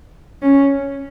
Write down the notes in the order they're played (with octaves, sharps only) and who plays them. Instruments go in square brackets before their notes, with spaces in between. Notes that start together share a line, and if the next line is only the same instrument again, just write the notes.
[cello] C#4